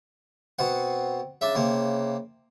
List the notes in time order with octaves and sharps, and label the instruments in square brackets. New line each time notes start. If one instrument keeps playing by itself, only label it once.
[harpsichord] B2 F#5 [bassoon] C4
[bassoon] C#3 [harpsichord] D4 E5
[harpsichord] C3 A#3